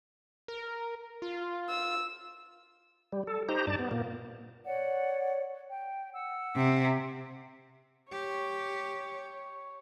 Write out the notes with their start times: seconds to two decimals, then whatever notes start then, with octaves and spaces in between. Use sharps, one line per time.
0.48 A#4
1.22 F4
1.69 E6
3.12 G3
3.27 A4
3.49 D#4 G4 C5 A#5
3.67 G2 D5 A5
3.79 B3
3.91 A#2 A#3
4.65 C#5 D5 F#5
5.69 G5
6.14 F#5 E6
6.56 C3
8.12 G4 C#5